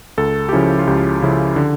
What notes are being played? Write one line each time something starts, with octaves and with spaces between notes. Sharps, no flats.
C#2 A4
G4
C#3 F3 C#4 E4 A4
F4
C#2 G4
C#3 F3 C#4 E4
D3